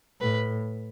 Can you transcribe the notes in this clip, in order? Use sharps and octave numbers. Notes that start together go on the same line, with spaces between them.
A2 B4